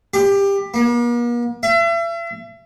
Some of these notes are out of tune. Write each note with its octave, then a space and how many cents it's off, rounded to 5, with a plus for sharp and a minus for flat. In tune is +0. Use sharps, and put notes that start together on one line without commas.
G4 +20
A#3 +45
E5 +40